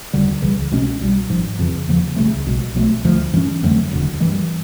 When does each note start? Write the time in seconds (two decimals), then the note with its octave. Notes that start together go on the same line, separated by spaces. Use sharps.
0.13 E1 D2 D3 G3
0.42 C#2 C#3 E3 G3
0.71 C2 B2 G#3 C#4
1.01 C2 B2 G3
1.29 G#1 G#2 F3
1.59 F2 C#3 E3
1.88 E2 C#3 F3 A#3
2.16 C#2 C#3 F#3 A3
2.46 B1 B2 G#3
2.74 B1 B2 F#3 A3
3.04 D2 D3 F3 A3
3.33 G2 E3 G#3 C#4
3.63 F2 D3 F#3 A3
3.91 E1 D2 D3
4.20 G2 E3 G#3